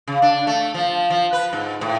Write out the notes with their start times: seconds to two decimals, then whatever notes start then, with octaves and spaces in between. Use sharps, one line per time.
0.07 C#3
0.22 D4
0.47 A3
0.74 F3
1.10 F3
1.33 B4
1.53 G#2
1.81 A2